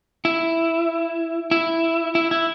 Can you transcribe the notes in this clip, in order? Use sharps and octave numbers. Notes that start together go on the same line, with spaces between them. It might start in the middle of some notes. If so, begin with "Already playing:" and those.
E4
E4
E4
E4